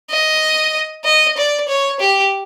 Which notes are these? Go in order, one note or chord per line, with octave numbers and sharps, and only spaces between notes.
D#5
D#5
D5
C#5
G4